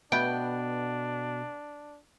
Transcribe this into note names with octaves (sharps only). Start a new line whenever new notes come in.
B2 A3 B3 D4 B4 G5